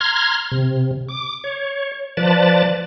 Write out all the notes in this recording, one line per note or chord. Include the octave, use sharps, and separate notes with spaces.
A#5 C6 F6 G#6
C3
D6
C#5
F3 B4 D5 A5